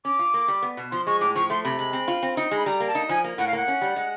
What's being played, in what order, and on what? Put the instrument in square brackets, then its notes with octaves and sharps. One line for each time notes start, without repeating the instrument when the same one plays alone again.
[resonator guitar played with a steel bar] C#4 [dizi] D6
[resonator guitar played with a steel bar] F4
A#3
G3
B3
B2
[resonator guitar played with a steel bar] F3 [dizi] C6
[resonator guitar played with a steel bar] G#3 [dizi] C#6
[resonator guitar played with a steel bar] A2 [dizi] D6
[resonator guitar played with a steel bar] F3 [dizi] C#6
[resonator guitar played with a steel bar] A3 [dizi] C6
[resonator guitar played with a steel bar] C3 [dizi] B5
[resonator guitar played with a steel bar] G#3
C4
F4
C4
D#4
G#3
[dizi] B5
[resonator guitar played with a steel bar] G3 [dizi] A#5
[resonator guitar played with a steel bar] A#3
[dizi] A5
[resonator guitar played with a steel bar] D#4
[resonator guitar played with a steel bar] F3 [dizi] G#5
[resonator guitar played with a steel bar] A#3
[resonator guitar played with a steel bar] A2 [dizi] F#5
[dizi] F5
[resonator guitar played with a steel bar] A#3 [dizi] F#5
[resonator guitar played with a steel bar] C#4
G3
G#3